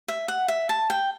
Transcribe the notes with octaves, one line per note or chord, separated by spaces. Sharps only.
E5
F#5
E5
A5
G5